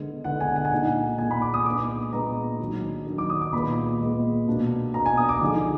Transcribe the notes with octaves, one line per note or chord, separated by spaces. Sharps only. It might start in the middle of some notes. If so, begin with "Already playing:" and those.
Already playing: D3 G#3 B3
D3 G#3 B3 F#5
G#5
F#5
G#5
A#2 G#3 D#4 F#5
A#2 G#3 D#4 G#5
B5
D6
D#6
A#2 G#3 B3 D4 D6
A#2 G#3 B3 D4 A#5
D#3 F#3 D4
D#3 F#3 D4
D6
D#6
D6
A#2 G#3 B3 B5
A#2 G#3 B3
B2 A#3 D4
B2 A#3 D4 A#5
G#5
D#6
D6
D3 F3 G#3 D#4